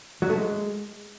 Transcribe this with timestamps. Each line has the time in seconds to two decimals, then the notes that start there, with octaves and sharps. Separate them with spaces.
0.22 F#3
0.30 A3
0.37 G#3